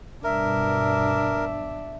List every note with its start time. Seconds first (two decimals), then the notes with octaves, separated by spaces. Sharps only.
0.24 G2 B2 D4 A#4 E5